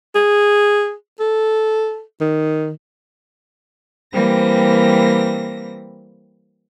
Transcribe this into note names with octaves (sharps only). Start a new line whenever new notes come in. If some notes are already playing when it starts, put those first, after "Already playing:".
G#4
A4
D#3
E3 G3 A#3 C4 A#6